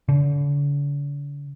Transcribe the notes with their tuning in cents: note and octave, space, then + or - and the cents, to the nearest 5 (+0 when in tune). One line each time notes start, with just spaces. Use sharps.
D3 -45